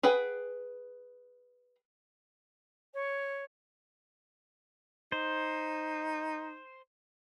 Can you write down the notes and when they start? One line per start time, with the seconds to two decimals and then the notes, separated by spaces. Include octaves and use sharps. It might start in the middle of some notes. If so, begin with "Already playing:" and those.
0.03 G#4 B4 F#5 G5
2.93 C#5
5.12 D#4 C5